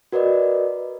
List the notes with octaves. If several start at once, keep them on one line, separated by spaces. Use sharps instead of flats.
F#4 A#4 B4 D5 D#5